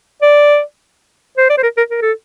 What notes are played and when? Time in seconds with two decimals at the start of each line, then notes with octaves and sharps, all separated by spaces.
0.22 D5
1.37 C5
1.49 D5
1.58 C5
1.63 A#4
1.77 A#4
1.91 A#4
2.02 A4